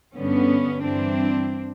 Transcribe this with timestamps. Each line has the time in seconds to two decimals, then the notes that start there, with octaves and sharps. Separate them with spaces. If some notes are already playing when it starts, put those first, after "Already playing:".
0.14 G2 D3 G3 B3 C#4
0.83 G2 E3 G3 C4 D4